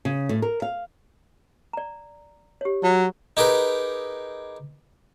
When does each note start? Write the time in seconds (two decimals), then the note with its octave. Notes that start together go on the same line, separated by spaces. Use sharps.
0.05 C#3
0.29 A2
0.42 A#4
0.62 F5
1.73 D5 A#5
2.61 G4 C#5
2.83 F#3 C#5
3.37 D#4 G4 G#4 A#4 B4